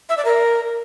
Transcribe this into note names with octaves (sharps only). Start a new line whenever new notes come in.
E5
D5
A#4